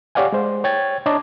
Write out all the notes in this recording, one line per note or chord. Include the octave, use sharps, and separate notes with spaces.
G4 C#5 D5 F5 F#5 G#5
G#3 C5
C#5 G5 G#6 A6
D4 C#5 D#5 A5 A#5 D6